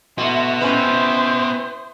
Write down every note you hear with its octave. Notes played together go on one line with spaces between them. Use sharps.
A3 B3 E4 F#4 D#5 C6
C4 C#4 E4 B4 C5